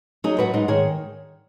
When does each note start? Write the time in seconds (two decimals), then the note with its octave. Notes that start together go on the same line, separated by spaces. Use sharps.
0.24 F#3 D#4 G#4
0.39 G#2 F#4 B4
0.54 G#2 D#4 G#4
0.68 D#3 G#4 C#5